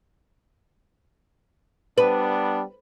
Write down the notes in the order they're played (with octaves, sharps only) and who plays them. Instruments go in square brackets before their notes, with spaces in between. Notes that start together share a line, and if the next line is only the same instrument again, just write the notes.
[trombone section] G3 B3 D4 [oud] B4